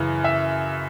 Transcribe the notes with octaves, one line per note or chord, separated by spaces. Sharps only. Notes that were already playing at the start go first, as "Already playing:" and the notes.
Already playing: F#2 C#3 E3
E5